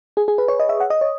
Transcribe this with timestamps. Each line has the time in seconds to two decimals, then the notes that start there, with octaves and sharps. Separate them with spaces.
0.17 G#4
0.28 G#4
0.38 B4
0.48 C#5
0.60 D#5
0.69 E5
0.80 F#5
0.90 D#5
1.01 C#5